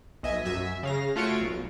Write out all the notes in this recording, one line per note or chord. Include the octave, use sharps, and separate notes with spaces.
B1 D#5 E5 G#5
F#2 E5 G#5
C#3 F5 A#6
A3 F4 F#4 C#5 D7
B1